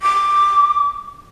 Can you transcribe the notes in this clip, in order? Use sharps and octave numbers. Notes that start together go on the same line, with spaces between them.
D6